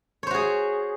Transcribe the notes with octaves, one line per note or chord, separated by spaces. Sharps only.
F#4 G#4 C5 C#5